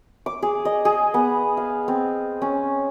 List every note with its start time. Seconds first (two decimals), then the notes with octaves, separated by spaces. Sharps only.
0.26 D6
0.42 G#4
0.65 D#5
0.85 G#4
1.14 B3
1.57 F5
1.88 C4
2.42 C#4